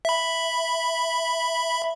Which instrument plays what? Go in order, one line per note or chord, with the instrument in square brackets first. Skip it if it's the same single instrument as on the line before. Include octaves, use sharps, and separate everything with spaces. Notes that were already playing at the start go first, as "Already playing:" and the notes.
[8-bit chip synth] E5 B5